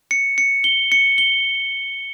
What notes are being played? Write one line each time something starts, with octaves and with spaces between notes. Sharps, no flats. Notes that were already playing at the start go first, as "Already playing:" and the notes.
C#7
C#7
G7
C#7
G7